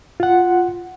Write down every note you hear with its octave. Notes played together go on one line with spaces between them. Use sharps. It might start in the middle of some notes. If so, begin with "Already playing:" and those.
F4 F#5